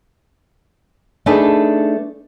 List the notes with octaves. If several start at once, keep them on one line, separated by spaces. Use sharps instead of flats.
A3 D4 D#4 G#4 A4 B4